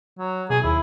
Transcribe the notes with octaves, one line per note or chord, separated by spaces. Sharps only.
F#3
B2 G#4
D#2 E4